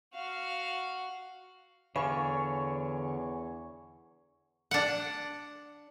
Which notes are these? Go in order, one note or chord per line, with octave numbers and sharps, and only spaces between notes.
F#4 F5
E2 D3 C#5 F5 G#5 B5 C#6
D4 F#5